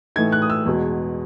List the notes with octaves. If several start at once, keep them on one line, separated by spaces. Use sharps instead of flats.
A2 E3 A3 D#4 G#6
F#6
D#6
E6
E2 B2 G#3